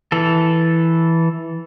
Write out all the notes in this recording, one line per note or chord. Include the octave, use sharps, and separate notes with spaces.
E3 A4